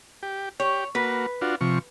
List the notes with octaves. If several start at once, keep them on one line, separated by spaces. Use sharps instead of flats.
G4
G4 C#5
A#3 F#4 B4
D4 F4 F#4
C3 F3 C#6